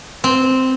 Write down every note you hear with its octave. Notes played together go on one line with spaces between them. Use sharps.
C4